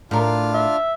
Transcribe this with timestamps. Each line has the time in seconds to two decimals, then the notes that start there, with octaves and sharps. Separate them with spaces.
0.11 A2 D4 F4 A#4 F6
0.54 E5